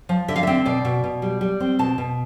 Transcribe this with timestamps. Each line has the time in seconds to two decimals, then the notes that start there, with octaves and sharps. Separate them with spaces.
0.09 F3
0.28 D3 E5
0.36 F5
0.43 C4 E5
0.66 B2 D5
0.85 B2
1.04 B2
1.22 G3
1.41 G3
1.60 C4
1.79 B2 A5
1.98 B2